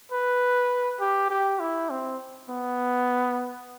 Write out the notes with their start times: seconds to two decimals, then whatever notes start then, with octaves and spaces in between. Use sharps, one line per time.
0.11 B4
1.00 G4
1.30 G4
1.60 E4
1.90 C4
2.50 B3